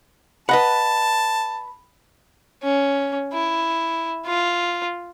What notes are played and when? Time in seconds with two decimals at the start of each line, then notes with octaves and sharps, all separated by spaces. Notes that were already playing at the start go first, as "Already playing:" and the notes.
0.49 B4 D#5 F#5 A5 B5
2.62 C#4
3.33 E4
4.26 F4